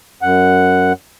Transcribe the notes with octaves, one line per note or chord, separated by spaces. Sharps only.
F#2 F#5